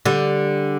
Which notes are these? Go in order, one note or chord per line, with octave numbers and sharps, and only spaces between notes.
D3 G3